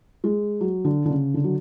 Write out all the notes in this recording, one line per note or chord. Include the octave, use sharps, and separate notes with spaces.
G#3
F#3
D3
D3
C#3
D3
F#3